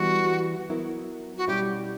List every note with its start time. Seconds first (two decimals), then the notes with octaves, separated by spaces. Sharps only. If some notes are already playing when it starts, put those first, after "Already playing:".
Already playing: E3 G3 B3 E4 F#4
0.69 F#3 B3 E4 A#4
1.37 F#4
1.47 B2 G3 C#4 E4 G4